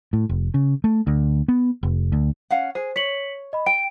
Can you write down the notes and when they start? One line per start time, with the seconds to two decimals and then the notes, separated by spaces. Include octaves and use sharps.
0.13 A2
0.29 F1
0.54 C#3
0.84 A3
1.07 D2
1.48 B3
1.83 F1
2.12 D2
2.50 C#4 F5 F#5
2.75 G#4 C5
2.96 C#5 B6 C#7 F#7
3.53 D#5 B5
3.66 G5 D7